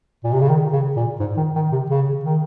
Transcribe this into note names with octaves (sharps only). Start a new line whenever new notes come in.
A#2
C3
C#3
D#3
C#3
A#2
G#2
D#3
D#3
C3
C#3
D#3